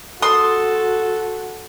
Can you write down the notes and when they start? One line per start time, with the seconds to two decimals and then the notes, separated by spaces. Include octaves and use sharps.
0.22 F#4 A4 C6 D#6